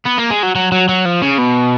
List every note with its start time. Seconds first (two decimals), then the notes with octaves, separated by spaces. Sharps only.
0.05 B3
0.18 A#3
0.30 G#3
0.43 F#3
0.55 F#3
0.72 F#3
0.89 F#3
1.05 F3
1.22 C#3
1.38 B2